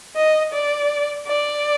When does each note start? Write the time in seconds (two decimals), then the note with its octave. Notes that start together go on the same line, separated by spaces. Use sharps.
0.16 D#5
0.53 D5
1.28 D5